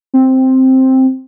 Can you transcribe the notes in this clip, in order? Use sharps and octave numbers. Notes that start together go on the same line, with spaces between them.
C4